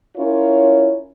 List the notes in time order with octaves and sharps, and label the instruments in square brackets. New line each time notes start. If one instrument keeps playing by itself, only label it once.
[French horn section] C#4 E4 F4 A#4 C#5